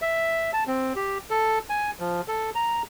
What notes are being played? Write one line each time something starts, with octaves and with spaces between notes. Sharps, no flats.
E5
A5
C4
G4
A4
G#5
F3
A4
A#5